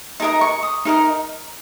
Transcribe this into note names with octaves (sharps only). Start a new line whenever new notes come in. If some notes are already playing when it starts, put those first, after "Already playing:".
D#4 A#4 D#5 A#5
C#6
D#6
D#4 A#4 D#5